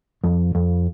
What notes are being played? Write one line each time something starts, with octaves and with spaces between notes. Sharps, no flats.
F2
F2